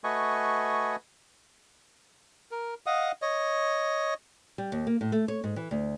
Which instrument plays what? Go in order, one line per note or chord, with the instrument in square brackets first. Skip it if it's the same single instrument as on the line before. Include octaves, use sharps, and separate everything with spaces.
[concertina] A3 F#4 B4 D#5 G#5 C#6
[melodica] A#4
D#5 F5 F#5 D#6
C#5 D#5
[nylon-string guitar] G3
D#2
A#3
A2
A3
C#5
G#2
E3
D2